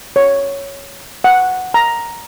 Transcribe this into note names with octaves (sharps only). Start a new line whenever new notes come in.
C#5
F#5
A#5